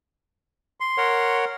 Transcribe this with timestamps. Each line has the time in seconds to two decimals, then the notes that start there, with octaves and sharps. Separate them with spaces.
0.80 C6
0.97 A#4 C#5 F#5